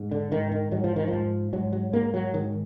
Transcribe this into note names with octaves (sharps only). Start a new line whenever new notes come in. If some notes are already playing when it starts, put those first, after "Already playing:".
Already playing: G#2
D3
G#2 D#3
D#3
G#2 F#3
F3
D#3
F3
G#2
G#2 F#3
F#3
G#2 A#3
F#3
G#2 D#3